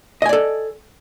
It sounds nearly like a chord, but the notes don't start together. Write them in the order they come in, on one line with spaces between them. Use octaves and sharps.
D#5 G#5 D5 A4